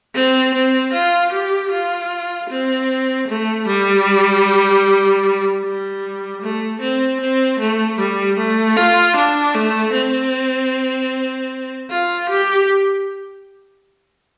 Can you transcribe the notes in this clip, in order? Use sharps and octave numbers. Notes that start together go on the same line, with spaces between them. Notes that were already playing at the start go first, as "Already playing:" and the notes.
C4
C4
F4
G4
F4
C4
A3
G3
G3
A3
C4
C4
A3
G3
A3
F4
D4
A3
C4
F4
G4